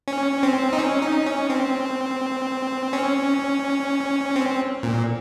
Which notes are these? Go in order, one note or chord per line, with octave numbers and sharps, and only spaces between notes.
C#4
C4
D#4
C#4
D#4
C#4
C4
C#4
C4
A#2